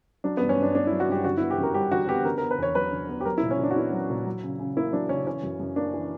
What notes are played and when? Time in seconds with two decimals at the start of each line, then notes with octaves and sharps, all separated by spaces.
0.24 F#3 D4
0.37 G2 B3
0.49 C#4
0.58 G2
0.63 D4
0.74 B3 D4
0.87 F#3 E4
1.00 F#4
1.09 G2 G4
1.24 D3 F#4
1.37 B3 E4
1.50 G4
1.58 F#2
1.63 A#4
1.74 G3 G4
1.91 D3 F#4
2.08 B3 G4
2.25 D3 A#4
2.38 B3 A#4
2.51 B4
2.58 E2 C#5
2.75 F#3 B4
2.92 D3
3.09 B3
3.21 G4
3.25 F#3 A#4
3.38 E4
3.43 A#2
3.51 C#4
3.59 A#2 D4
3.71 F#4
3.76 B3 E4
3.93 F#3
4.10 A#2
4.26 F#3
4.43 C#3
4.59 C#3
4.77 A#3 E4
4.92 F#3 D4
5.09 C#3 C#4
5.27 E3 C#4
5.43 F#2
5.60 F#2
5.76 A#3 D4
5.94 E3